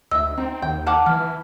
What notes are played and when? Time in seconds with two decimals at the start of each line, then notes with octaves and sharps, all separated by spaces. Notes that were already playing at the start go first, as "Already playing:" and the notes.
0.11 D2 D#5 E5 E6
0.38 C4 D#4 G5
0.62 D#2 G5
0.87 D#3 F5 F#5 A5 D6
1.06 E3 B3 F6
1.21 E3